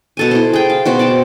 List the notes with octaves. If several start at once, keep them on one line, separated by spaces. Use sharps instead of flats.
B2 A4 G#5
E4 C5
G#4 G5
F5
B2 F#4 C5
D5 G5 A5